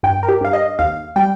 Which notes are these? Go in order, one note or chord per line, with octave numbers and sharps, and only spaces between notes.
G2 G5
A#4
G4
G2 F5
D#5
D#2 F5
G3 G5